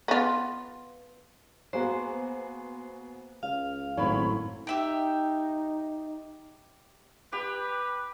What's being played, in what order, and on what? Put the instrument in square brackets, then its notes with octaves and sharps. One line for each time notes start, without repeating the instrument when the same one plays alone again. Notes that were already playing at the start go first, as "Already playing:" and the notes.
[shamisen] B3 F4
[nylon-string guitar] A#3 [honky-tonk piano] B3 F#4 G#4 [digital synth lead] C5
[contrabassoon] C#2 [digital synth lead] F5
[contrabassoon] G#1 [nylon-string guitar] F#2 A2 C4 [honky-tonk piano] C#5 B5
[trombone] D#4 [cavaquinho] G4 E5 G5
[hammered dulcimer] G4 [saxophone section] B4